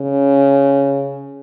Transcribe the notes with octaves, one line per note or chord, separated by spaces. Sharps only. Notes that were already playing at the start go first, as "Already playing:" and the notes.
Already playing: C#3